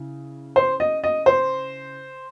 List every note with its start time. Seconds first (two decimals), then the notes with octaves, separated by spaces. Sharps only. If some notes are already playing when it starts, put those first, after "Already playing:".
Already playing: C#3 E4
0.56 C5
0.80 D#5
1.04 D#5
1.26 C5